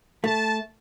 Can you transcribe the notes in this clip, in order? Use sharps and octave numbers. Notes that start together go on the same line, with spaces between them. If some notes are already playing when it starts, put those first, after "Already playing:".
A3 A5